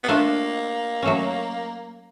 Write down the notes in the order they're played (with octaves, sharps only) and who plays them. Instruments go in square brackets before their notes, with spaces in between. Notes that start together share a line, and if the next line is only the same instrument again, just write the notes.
[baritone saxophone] B3
[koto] A3 D4 F4 [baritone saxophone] A#3
[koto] F#3 A3 C#4